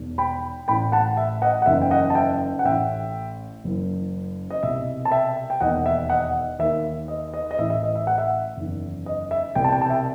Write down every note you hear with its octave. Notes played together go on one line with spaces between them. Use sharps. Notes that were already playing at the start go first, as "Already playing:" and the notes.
Already playing: E1 E2 D#3
G5 B5
A1 A2 E3 G5 B5
F#5 A5
E5
D#5 F#5
F#5
F#1 E2 D#3 E5
G5
D#5 F#5
A5
E5 G5
F#5
A1 A2 E3 E5 G5
F#1 F#2 E3
D#5
C2 B2 E5
A5
E5 G5
G5
E1 D#2 D#3 D#5 F#5
E5
D#5 F#5
D#2 D#3 E5
D#5
D#5
D#5
A1 A2 E3 E5
E5
D#5
E5
F#5
E5
F#1 E2 D#3
D#5
E5
C2 B2 G5
A5
G5
A5
E5 G5